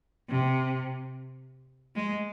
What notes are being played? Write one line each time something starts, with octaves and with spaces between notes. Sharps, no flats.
C3
G#3